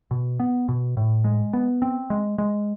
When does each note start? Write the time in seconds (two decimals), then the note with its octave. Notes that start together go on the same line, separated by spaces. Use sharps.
0.11 B2
0.40 B3
0.69 B2
0.97 A2
1.24 G#3
1.53 B3
1.82 C4
2.10 G#3
2.38 G#3